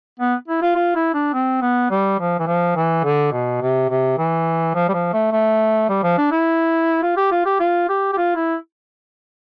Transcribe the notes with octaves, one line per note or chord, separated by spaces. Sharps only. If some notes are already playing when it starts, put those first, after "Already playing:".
B3
E4
F4
F4
E4
D4
C4
B3
G3
F3
E3
F3
E3
D3
B2
C3
C3
E3
F3
G3
F3
A3
A3
G3
F3
D4
E4
F4
G4
F4
G4
F4
G4
G4
F4
E4